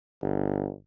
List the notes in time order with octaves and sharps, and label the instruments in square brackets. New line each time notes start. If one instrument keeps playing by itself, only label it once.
[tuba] G1